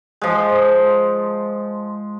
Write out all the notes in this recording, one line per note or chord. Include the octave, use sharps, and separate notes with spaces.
F3 G#3